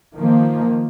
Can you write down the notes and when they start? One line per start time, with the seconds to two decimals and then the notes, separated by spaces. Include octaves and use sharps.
0.14 D#3 F3 A#3